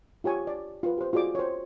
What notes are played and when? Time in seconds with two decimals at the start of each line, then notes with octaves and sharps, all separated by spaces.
0.24 F4 G4 C#5 G#5 C#6
0.47 D5
0.83 F4 B4
0.98 G4 C5
1.13 F4 F#4 G#4 D5 D6
1.35 C5 C#5